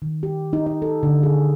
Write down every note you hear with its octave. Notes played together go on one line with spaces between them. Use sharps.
D#3
G4
D#4
D#4
A4
D3
G#4